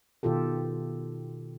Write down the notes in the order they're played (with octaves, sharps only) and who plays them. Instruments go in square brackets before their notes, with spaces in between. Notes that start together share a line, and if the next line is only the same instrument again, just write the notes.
[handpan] B2 D#3 F4 G4 A4